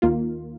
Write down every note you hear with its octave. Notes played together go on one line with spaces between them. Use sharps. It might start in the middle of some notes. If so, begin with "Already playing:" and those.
D#2 D#3 A#3 F4